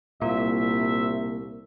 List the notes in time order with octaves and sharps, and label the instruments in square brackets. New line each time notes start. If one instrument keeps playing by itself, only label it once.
[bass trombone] C2 [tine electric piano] A#2 [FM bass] A#3 [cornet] E5